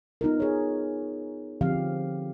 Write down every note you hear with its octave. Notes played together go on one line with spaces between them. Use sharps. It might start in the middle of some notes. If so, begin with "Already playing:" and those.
B3 D#4 F4 A#4
G#4 C#5
D3 F3 C4 G4 F5